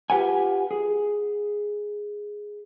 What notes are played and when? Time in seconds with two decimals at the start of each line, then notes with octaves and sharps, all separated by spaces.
0.10 F4 G4 B4 F#5 G#5
0.71 G#4